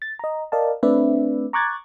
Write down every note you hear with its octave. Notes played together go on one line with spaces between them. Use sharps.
A6
D#5 A#5
A#4 D5 D#5 F5 A5
A3 C4 D4 B4 D5 E5
A#5 C#6 D6 F#6 G#6 A6